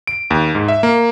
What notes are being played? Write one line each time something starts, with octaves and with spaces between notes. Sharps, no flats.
D7
D#2
G#2
E5
A#3